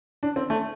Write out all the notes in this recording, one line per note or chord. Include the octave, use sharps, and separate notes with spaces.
D4
C4
A3